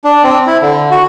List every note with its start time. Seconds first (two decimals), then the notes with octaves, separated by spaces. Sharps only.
0.04 D4
0.24 C4
0.47 E4
0.62 D3
0.91 F#4